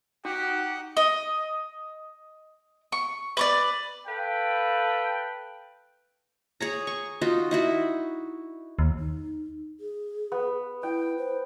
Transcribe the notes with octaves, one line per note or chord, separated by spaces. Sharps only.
D#4 F#4 G4 F#5
D#5
C#6
B4 C#5 D5
A4 B4 F5 G5
G#4 C#5 A#5
C#6
D#4 F4 F#4
D#4 E4 F#4
D#2
D#4
G#4
B3
E4 G5
C5